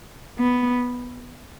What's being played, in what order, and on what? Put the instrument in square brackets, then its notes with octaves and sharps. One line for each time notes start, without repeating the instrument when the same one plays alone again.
[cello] B3